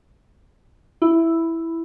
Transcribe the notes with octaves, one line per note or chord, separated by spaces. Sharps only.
E4